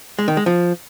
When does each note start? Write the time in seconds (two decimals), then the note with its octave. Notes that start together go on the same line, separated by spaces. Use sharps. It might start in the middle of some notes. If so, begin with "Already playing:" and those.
0.19 G#3
0.28 D#3
0.37 G#3
0.46 F3